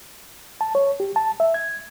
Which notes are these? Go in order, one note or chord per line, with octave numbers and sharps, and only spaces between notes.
A5
C#5
G4
A5
E5
G#6